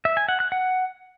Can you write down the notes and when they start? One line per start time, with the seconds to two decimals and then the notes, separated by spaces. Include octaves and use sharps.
0.05 E5
0.17 G#5
0.29 F#5
0.40 F#6
0.52 F#5